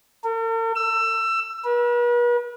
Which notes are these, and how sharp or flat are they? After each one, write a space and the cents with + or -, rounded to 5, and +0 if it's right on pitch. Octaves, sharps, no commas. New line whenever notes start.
A#4 -45
E6 +20
B4 -45